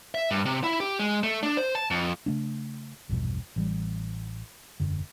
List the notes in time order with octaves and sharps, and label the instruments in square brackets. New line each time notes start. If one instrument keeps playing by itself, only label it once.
[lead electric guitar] E5
G2
C3
E4
G4
G#3
A3
D4
C5
A5
F2
[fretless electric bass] C#3 A3 D4
A#1 E2 G2 B2
A1 E3 G3
E1 F#2 D3